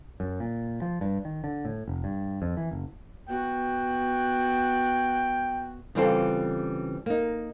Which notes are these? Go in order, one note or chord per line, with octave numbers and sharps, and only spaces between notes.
F#2
A#2
F3
G2
D#3
D3
A2
F1
G2
F2
E3
F#1
B3 F#4 G5
C#3 E3 G3 C4 F4 A4
A#3 D#4